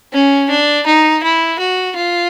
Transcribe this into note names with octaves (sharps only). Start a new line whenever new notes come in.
C#4
D4
D#4
E4
F#4
F4